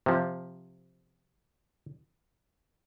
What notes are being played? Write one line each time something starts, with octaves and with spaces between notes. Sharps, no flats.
C3 F3